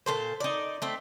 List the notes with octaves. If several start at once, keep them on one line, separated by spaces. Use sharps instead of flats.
A#2 G#3 A4 C5
D#4 D5
A3 C4